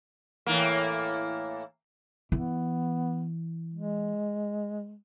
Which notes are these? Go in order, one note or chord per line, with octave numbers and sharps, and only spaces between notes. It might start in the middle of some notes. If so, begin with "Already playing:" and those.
A2 E3 A#3
E3 B3
G#3